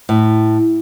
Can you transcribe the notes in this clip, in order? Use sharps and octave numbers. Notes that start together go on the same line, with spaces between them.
A2